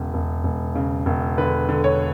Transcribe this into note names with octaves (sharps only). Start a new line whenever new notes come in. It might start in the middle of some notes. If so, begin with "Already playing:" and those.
Already playing: E1 C#3
E1
E1
C#3
E1
D3 B4
D3
C#5